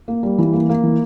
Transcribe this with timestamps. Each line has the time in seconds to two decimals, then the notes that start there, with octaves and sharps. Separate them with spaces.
0.08 A#3
0.23 G3
0.38 E3
0.53 A#3
0.69 A#3
0.83 E3